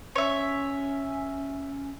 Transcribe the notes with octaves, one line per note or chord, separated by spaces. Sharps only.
C#4 C#5 E5